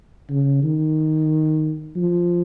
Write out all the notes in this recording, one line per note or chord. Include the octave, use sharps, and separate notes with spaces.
C#3
D#3
F3